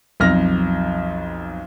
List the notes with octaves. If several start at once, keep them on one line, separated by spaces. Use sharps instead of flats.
B1 F2 F6 A#6